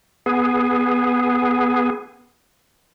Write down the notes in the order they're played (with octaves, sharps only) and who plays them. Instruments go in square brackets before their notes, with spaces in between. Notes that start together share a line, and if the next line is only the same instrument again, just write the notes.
[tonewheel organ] B3 G#4